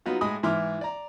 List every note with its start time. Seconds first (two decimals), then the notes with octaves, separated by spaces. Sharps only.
0.06 F#3 B3 D#4 F4 F#4
0.21 A2 G#3 D#5 G#5 B5 D#6
0.43 G#2 E3 E5 C6 D6 F6
0.81 D5 A#5